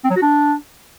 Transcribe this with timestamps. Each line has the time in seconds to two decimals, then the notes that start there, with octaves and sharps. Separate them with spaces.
0.04 C4
0.10 F#3
0.16 F#4
0.22 D4